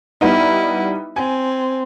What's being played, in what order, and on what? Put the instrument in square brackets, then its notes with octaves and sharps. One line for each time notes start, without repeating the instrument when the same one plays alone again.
[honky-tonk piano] G3 B3 D#4 [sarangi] E4
[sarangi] C4 [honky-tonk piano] G#5